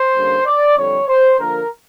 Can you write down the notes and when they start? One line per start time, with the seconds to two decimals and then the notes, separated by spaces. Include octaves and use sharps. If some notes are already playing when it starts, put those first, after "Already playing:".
Already playing: C5
0.15 D3 G3 A#3 C#4
0.46 D5
0.76 F2 D3 G3 C#5
1.08 C5
1.39 D3 F3 A#3 A#4